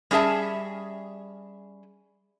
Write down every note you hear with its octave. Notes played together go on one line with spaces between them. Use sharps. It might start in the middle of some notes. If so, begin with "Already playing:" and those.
G3 C#4 G#4 E5 A5